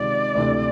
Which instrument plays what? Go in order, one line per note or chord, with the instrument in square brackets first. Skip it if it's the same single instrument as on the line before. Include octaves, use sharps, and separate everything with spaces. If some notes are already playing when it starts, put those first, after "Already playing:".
Already playing: [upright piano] C#2 C3 D#3 G#3 [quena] D5
[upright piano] D2 C3 E3 A3 D4